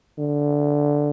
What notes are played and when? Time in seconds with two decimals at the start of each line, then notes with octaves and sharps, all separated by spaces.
0.18 D3